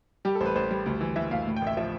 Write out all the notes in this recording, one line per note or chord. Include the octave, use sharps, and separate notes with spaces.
G3 G4
A4
A1 C5
B4
A1 C5
G3
D2
E3
E3 E5
D2 F5
A2
G5
A1
E5
F3 E5